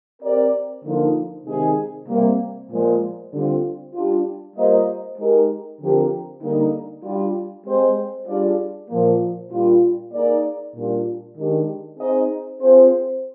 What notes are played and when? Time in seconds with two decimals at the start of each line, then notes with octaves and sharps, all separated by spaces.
0.23 C4 G4 A#4 D5
0.85 D3 F3 A#3 D#4
1.46 C3 D#3 G#3 D#4 G#4
2.08 C3 G3 A#3
2.70 A#2 F3 G#3
3.33 D3 G3 C4 F4
3.93 G3 D4 F4
4.56 G3 A#3 F4 C5 D#5
5.18 G#3 D#4 G4 A#4
5.80 D3 F3 C4 G4 A#4
6.41 D3 G3 A#3 D#4
7.03 G3 D4 F4
7.66 G#3 C4 G4 C5
8.27 G3 D4 F4 G#4 D5
8.89 A#2 F3 A#3
9.51 A#2 G3 D4 F4
10.13 A#3 D#4 G#4 D5
10.75 A#2 G3 D4 F4
11.36 D#3 G#3 D4 G4
11.99 C4 D#4 G#4 C5 D#5
12.61 C4 F4 G#4 C5